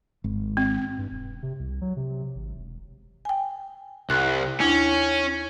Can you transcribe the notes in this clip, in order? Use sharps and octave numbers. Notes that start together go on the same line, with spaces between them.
G#1
C4
G2
E1
C3
C2
F#3
C3
G#1
E1
G5 G#5
C2 F#6
D#2 C#4 D4 E4